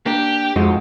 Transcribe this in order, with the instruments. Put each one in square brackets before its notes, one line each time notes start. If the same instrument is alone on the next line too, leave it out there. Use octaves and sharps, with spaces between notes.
[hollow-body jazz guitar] A#3 D4 [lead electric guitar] G4
[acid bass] F2 [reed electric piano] G#3 [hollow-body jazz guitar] C4 D#4 F#4